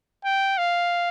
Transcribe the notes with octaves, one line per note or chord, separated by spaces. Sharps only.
G5
F5